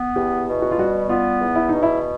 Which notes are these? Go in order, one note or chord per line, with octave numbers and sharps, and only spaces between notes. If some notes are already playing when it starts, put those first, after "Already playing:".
Already playing: B3
E2 G4
B2
F#4
F4
G3 F#4
B3 F4
E2
E4
B2 D#4
E4